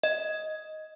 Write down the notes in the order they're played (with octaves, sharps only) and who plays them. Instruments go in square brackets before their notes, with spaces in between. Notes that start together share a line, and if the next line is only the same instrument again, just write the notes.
[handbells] D#5